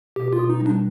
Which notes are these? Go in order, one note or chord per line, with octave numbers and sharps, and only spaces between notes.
B2 G4
F4
B2
D#4
G3
D4